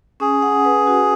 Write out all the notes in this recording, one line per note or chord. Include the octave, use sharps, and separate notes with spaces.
C#4 G#4
F#5
B4
F#4